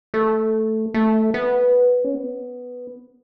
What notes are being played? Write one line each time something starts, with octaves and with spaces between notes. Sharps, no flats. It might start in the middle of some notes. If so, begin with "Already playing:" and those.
A3
A3
B3
C#4
B3